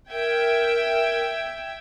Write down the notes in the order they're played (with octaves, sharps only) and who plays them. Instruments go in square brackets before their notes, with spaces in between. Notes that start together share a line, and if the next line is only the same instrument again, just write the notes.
[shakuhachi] A#4 [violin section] E5 G5 G#6